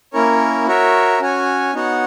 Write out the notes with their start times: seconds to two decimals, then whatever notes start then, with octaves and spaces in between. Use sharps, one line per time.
0.13 A#3 C#4 E4 A#4 C#5
0.67 F#4 A#4 C#5 E5
1.20 C#4 F#4 C#5 G#5
1.74 B3 D#4 F#4 C#5 F#5